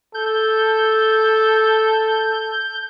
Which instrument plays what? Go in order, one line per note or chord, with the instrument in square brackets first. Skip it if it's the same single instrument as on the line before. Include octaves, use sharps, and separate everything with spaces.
[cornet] A4 [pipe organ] G6